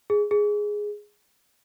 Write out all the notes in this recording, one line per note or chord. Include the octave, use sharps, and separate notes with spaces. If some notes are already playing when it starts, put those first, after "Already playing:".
G#4
G#4